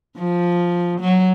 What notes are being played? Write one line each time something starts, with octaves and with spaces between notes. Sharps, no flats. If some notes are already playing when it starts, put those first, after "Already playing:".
F3
F#3